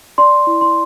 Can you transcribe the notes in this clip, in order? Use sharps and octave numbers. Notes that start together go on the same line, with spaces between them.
D5 C6
E4
C6